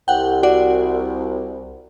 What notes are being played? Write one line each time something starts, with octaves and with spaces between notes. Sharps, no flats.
C2 F#5 G5
F#4 D5 F#5